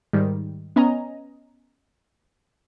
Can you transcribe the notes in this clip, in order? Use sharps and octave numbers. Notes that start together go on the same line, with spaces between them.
G#2 D#3 G3
B3 C#4 D#5 G#5 A#5